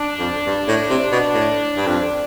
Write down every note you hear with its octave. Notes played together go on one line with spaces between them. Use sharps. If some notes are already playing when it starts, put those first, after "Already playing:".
Already playing: D4
F2
G2
A2
C3
B2
A2
G2
F2